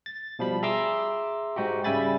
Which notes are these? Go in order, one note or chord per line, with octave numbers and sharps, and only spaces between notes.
A6
B2 F3 G3 B5
G#4 E5 A#5 C6 D6 E6
G#2 D#4 F#4 G4
C#3 G3 E5 G#5 B5 A6